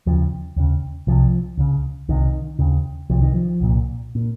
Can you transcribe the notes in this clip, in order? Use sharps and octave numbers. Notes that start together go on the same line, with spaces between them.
D#2 C#3 F3
D#2 C#3
C2 C3 F3
C#2 C#3
C2 C3 D#3
D#2 C#3
C2 C3 F3
D#3
F3
C2 A#2
A#2